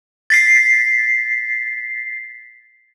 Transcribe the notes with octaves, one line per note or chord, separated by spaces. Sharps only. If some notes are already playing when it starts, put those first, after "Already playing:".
A6 B6 C7